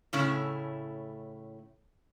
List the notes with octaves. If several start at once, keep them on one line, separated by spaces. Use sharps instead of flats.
A2 C#3 A3 C#4 E4